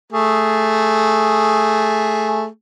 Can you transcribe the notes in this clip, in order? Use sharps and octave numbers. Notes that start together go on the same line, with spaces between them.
A3 G#4